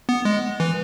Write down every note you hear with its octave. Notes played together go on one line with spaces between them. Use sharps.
B3
G#3
E3